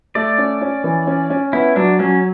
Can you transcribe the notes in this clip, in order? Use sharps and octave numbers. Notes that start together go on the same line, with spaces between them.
A3 D5
C#4
C#4
E3
C#4
C#4
B3 E4
F#3 D4
F#3 C#4